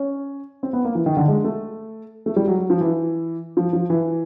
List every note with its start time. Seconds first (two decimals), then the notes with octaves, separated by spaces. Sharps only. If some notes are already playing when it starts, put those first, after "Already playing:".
Already playing: C#4
0.63 C4
0.73 B3
0.85 A#3
0.95 E3
1.06 D#3
1.17 D3
1.28 G#3
1.44 A3
2.26 A3
2.36 G3
2.48 F#3
2.58 F#3
2.70 F3
2.81 E3
3.57 F3
3.73 F3
3.90 E3